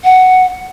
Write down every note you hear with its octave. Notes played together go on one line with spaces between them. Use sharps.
F#5